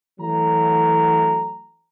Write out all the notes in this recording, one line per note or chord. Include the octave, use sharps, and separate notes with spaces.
E3 F#3 A3 F#4 A#5